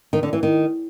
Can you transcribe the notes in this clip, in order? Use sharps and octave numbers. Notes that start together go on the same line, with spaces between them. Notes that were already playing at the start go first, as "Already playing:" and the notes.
D#3
D3
E3
D#3